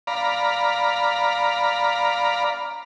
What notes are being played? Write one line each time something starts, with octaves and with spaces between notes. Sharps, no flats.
D5 F5 A#5 B5